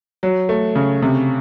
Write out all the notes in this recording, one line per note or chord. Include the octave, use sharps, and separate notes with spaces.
F#3
A3
C#3
C3